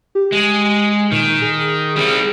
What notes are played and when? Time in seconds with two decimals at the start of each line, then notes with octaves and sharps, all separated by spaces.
0.15 G4
0.32 G#3
1.12 A#2 D#3
1.42 G#4
1.96 G3 C4